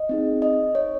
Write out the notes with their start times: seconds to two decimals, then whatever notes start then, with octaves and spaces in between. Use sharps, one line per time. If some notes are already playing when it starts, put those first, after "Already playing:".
Already playing: D#5
0.09 C4 D#4 G#4
0.42 D#5
0.75 C#5